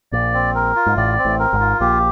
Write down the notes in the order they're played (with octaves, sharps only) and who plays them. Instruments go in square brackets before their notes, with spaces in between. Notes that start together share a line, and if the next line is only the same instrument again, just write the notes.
[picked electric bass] A#1 A#2 [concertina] D5
[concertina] C4
A#4
F4
[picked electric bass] G#2
[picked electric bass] A1 A2 [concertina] D5
[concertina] C4
[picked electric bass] A1 A2
[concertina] A#4
[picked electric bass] G#1 G#2
[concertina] F4
[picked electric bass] A#1 A#2 [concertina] G4